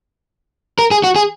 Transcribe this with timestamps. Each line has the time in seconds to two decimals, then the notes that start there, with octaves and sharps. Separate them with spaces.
0.79 A#4
0.91 G#4
1.04 F#4
1.16 G#4